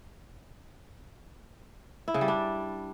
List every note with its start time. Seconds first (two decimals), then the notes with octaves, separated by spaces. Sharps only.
2.08 E4
2.14 C#3
2.21 G3
2.28 D4